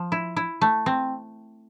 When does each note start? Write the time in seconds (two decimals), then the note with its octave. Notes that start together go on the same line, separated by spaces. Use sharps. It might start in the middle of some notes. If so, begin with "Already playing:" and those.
Already playing: F3
0.12 E4
0.36 E4
0.61 A3
0.86 C4